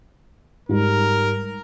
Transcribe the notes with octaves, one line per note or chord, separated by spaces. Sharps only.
G#2 G3 A#4